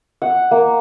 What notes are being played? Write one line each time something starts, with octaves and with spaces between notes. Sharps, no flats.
F#5
A#3